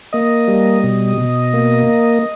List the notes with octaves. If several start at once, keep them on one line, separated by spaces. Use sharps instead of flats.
A#3 D#5
G3
B2
B2
A#3